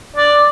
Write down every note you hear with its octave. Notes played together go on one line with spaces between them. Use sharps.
D5